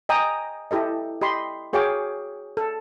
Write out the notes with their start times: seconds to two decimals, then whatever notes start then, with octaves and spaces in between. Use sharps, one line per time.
0.09 D#5 G5 G#5 A#5 D#6
0.71 E4 G4 A4 D#5
1.21 G4 D#5 B5 C6
1.73 F#4 G#4 C#5 F5 G5 D6
2.57 A4